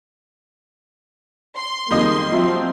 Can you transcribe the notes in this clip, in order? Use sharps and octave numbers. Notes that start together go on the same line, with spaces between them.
C6
F2 D#3 G3 G#3 A#3 D#5 D#6
F3 F#3 C4 E5